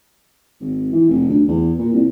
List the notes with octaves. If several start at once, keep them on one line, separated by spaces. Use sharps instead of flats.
G#1
E3
F1
D2
E2
A#2
C2